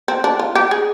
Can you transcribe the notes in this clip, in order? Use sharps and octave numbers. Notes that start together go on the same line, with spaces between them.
C4
D4
F4
G4
G#4